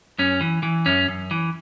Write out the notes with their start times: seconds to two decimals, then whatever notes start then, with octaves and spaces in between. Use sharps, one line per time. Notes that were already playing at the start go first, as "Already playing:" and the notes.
0.19 F#2 C#4
0.41 E3
0.63 E3
0.86 F#2 C#4
1.08 F#2
1.31 E3